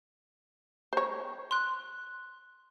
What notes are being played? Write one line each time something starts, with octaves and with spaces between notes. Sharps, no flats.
C5 C#5
C6 F#6